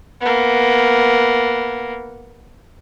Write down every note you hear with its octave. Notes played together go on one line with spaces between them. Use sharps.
A#3 B3